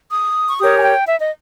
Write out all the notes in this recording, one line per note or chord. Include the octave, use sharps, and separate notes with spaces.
D#6
C#6
G4 A#4 C#5 D#6
G#5
G5
E5
D#5